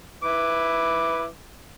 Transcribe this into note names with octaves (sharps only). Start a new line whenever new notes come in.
E4 B4 D6